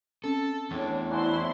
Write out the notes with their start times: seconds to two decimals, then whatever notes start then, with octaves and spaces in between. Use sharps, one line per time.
0.24 C4 C#4 A4
0.71 E2 A2 D4
1.11 D4 E4 F#4 C5 C#5 G#5 A#5 C6